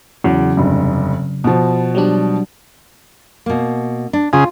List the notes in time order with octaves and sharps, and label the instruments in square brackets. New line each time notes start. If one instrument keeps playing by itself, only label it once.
[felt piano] E2 [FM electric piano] C#3 F#3
[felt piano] F1 G2
B2 F3
[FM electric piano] F#3 G3 D4
[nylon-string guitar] B2 A#3
D4
[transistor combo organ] C#3 G#4 [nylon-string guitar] F4